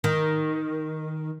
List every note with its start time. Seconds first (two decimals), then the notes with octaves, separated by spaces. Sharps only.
0.04 D#3